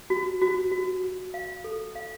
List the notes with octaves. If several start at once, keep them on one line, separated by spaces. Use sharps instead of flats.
F#4
F#4
F#4
F#4
F5
A4
F5